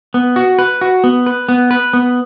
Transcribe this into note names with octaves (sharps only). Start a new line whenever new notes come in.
B3
F#4
B4
F#4
B3
B4
B3
B4
B3